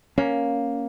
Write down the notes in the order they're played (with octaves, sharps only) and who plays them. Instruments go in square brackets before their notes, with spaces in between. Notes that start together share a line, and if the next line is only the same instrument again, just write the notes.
[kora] A#3 [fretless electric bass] C#4